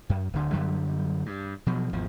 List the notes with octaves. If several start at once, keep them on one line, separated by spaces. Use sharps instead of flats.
F#2
D1 D3
F#2 D3 F#3 G3
G2
B2 F3 F#3
G#1 E2 F3